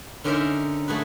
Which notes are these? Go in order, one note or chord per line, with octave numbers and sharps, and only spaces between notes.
D3 C#4 D#4 A#4 C5 E5
A3 F#4 G#4 B4